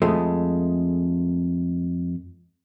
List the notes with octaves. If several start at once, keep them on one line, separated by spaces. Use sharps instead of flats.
F2 G#3 A3